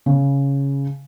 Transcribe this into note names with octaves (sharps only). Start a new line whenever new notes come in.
C#3